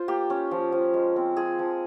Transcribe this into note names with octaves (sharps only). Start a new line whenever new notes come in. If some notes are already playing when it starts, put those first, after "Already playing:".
Already playing: F4 C5
A#3 G4
C#4
F3
F3
G#3
C4
F4 G#4
F3